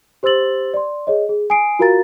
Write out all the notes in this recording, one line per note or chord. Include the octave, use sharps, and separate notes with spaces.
G4 C5 C6 E6 A6 F#7
D5 C6
G#4 C#5 D#5
G#4
G#5 D#6 C7 D7
F4 F#4 A#4 F5 A#5 A6